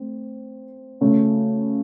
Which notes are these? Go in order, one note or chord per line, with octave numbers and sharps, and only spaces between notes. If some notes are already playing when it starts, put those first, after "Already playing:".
Already playing: A3 C4
C#3 A3 C#4 F#4